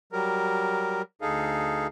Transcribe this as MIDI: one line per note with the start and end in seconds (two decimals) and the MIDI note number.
0.13 1.02 54
0.13 1.02 55
0.13 1.02 70
1.22 1.87 38
1.22 1.87 63
1.22 1.87 68
1.22 1.87 69
1.22 1.87 77